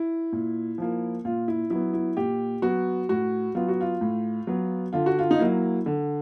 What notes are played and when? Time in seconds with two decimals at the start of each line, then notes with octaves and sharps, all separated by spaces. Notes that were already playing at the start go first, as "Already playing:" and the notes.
Already playing: E4
0.32 A#2
0.78 F3 A#3
1.25 A#2 F4
1.48 E4
1.70 F#3 B3 E4
1.93 E4
2.17 A#2 G4
2.62 F#3 B3 F#4
3.09 A2 F#4
3.55 F#3 B3 F4
3.68 F#4
3.81 F4
4.01 A2
4.47 F#3 B3
4.93 D3 F4
5.06 F#4
5.19 F4
5.31 D#4
5.39 F#3 A#3 E4
5.86 D3